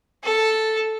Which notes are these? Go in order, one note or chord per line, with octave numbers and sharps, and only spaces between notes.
A4